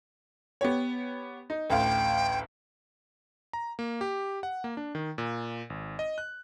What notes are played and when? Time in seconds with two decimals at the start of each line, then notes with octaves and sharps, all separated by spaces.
0.61 B3 G4 C#5
1.50 D#4
1.70 A1 D2 F5 G5
3.53 A#5
3.79 A#3
4.01 G4
4.43 F#5
4.64 A#3
4.77 D4
4.95 D#3
5.18 A#2
5.70 G#1
5.99 D#5
6.18 F#6